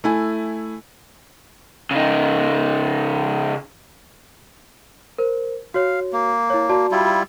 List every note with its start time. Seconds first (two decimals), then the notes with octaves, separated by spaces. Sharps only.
0.04 A3 E4 G#5
1.91 C#3 D#4
5.18 A#4 C5
5.74 F#4 C#5 F5
6.13 A#3
6.50 E4 C#5
6.69 F#4 D5 A5
6.92 G3 E4 F4